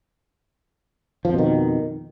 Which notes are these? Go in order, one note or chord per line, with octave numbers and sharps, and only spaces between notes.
F2 B2 D#3 F3